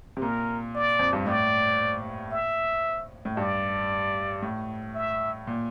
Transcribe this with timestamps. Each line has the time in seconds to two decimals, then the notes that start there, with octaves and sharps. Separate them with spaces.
0.17 C3
0.22 A#2 A#4
0.75 D5
0.99 F2
1.13 G2
1.27 A2 D5
2.32 E5
3.25 A2
3.37 G2 D5
4.42 A2
4.95 E5
5.47 A#2